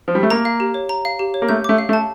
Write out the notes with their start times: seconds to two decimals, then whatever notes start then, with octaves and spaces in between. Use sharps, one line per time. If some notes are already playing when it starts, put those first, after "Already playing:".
0.08 F3
0.15 G3
0.23 A3
0.30 A#3 A#5
0.45 F5
0.60 G4
0.74 C#5
0.89 A#5
1.05 F5
1.19 G4
1.34 C#5
1.42 A#3
1.49 A3 G6
1.64 A3 D6
1.78 F5
1.89 A3
1.93 A5